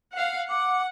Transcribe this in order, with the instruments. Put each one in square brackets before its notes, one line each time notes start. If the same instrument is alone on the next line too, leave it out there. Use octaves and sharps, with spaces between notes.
[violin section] F5 F#5
[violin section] F#5 [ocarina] D6